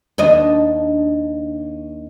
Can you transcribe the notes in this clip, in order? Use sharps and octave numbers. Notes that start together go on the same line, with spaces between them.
D#2 D4 D#5